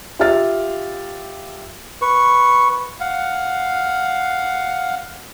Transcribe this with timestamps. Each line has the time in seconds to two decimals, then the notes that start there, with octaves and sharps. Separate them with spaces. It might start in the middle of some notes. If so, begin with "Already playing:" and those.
0.19 F4 G4 E5 F5 F6 A6
2.02 B4 C#6
3.00 F5 F#5